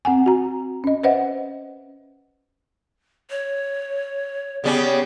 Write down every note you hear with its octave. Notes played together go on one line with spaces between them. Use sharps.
C4 F#5 G#5
F#4 A#5
C#4 D#5
B4 C5 D#5 E5 F#5
C#5
C#3 G3 B3 C#4